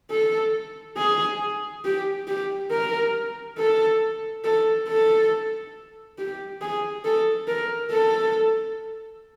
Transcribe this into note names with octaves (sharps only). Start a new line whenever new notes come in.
A4
G#4
G4
G4
A#4
A4
A4
A4
G4
G#4
A4
A#4
A4